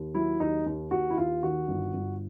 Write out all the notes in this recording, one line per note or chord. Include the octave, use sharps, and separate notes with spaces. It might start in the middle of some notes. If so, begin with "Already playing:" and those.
Already playing: D#2
F#3 E4
D#2 D#4
D#2
D#2 F#4
E4
D#2 F4
D#3 F#4
G1
G1